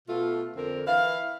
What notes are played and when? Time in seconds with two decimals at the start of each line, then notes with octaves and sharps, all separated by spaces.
0.06 B2 A3 F4
0.56 F2 D3 C4 A#4
0.86 E3 E4 F5